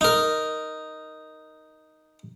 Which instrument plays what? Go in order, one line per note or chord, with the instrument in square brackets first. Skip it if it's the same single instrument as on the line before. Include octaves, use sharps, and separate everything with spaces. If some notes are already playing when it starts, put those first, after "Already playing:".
[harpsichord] D#4 A#4